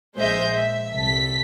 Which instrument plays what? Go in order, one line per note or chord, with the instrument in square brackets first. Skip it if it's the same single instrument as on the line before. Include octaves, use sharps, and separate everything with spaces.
[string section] A#1 G#3 C5 D#5 E5 G6
E5
C2 A4 B6